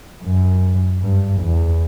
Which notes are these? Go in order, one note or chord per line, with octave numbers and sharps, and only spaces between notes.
F#2
G2
E2